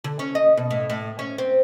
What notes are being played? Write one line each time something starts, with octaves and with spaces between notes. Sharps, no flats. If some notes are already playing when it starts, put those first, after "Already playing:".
D3
C#4
D#5
B2
A2
A2
C#4
C4